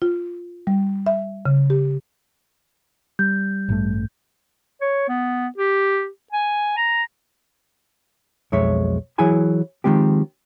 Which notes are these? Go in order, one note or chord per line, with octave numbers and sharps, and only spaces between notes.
F4
G3
E5
C#3
G4
G3 G6
A1 G2 A3
C#5
B3
G4
G#5
A#5
B1 F2 G#3 C#5 E5
E3 F#3 E4 G#4 G#5 B5
D#3 F3 G#3 C4 G4